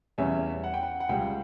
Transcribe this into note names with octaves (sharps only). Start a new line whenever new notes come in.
E2 C#3 G3 C#4 E5
F#5
G5
F#5
F#5
C#2 C#3 G3 G5